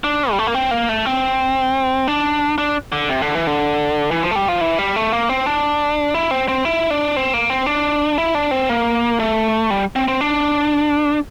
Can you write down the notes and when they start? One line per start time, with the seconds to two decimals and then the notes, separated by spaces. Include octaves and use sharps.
0.04 D4
0.31 G3
0.39 A3
0.47 A#3
0.54 C4
0.71 A#3
0.89 A3
1.05 C4
2.08 D4
2.58 D4
2.92 D3
3.09 C3
3.22 D3
3.35 E3
3.47 D3
4.11 E3
4.23 F3
4.31 A3
4.35 G3
4.48 F3
4.61 E3
4.78 G3
4.96 A3
5.12 A#3
5.29 C4
5.46 D4
6.14 E4
6.31 C4
6.49 C4
6.65 E4
6.90 D4
7.17 C4
7.34 A#3
7.50 C4
7.66 D4
8.18 E4
8.35 D4
8.51 C4
8.69 A#3
9.20 A3
9.70 G3
9.96 C4
10.08 C4
10.21 D4